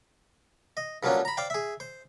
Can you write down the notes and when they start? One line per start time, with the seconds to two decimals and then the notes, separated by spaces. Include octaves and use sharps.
0.77 D#5
1.03 G2 F3 F#3 A#3 C#4 D4
1.25 A#5 B5
1.37 C5 D5 F5 G5
1.50 G#4 E5
1.80 C5